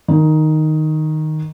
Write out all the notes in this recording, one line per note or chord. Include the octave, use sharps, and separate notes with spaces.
D#3